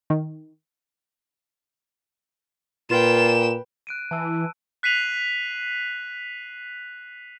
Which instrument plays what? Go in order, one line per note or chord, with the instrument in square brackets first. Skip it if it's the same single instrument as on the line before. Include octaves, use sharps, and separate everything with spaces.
[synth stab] D#3
[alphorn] A#2 [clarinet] F4 [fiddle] B4 G5 [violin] E7
[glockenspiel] F#6 D7 D#7
[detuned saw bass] E3 [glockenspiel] A5 E6
[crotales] F#6 B6 C7 D#7 F7 F#7